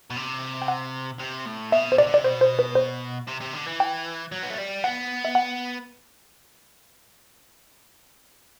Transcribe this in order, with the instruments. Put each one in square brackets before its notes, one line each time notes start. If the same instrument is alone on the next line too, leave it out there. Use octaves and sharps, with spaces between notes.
[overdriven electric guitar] B2
C3
[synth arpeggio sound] G5
F#5
[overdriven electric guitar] C3
A2
[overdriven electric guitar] B2 [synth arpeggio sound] E5
[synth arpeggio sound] C5
[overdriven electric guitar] C3 [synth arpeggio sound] D5
[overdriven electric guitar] D3
[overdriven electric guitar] C3 [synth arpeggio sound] D5
[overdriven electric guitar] B2 [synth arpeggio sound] C5
[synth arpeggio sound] C5
B4
C5
[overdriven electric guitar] C3
C3
D3
E3
[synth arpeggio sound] G5
[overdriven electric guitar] F#3
B3
A3
G3
[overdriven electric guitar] B3 [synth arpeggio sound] F#5
[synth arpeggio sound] E5
F#5